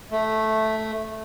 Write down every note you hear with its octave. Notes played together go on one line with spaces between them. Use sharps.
A3